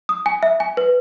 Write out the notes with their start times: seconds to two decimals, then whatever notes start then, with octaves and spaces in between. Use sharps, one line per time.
0.09 D#6
0.26 G#5
0.43 E5
0.60 G#5
0.77 B4